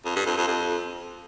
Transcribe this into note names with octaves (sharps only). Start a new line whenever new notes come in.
F2
G2
F2
F2
F2